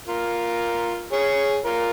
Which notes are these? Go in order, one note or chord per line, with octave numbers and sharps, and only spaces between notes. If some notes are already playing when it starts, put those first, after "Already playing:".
F4 A#4
G#4 C#5
F4 A#4